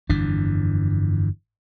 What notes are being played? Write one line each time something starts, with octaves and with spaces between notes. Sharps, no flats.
G1 F2 E3 D4